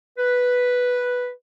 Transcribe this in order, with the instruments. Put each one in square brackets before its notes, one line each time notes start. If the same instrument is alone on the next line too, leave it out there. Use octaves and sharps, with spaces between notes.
[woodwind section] B4